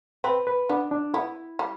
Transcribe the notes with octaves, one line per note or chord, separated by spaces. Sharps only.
C4 B4
B4
B3 D4
D4
B3 E4
G3